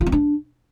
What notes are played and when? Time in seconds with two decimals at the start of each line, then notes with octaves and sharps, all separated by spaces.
0.01 F4
0.07 C4
0.12 D4